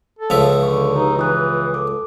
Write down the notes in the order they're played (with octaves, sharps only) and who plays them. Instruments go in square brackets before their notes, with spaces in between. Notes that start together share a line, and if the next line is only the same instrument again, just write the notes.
[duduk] A4
[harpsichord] C#2 F3 E5
[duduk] D3 [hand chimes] C#5 C#6
[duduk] D#4 [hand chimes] G4 B4
[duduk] E3 [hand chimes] F4 D#6 F#6
[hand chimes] A4 D6